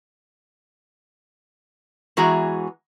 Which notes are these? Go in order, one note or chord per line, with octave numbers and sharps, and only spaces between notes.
E2 E3 G#3 F#4 G#4 A#5